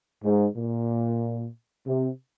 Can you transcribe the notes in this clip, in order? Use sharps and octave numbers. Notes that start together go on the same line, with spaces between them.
G#2
A#2
C3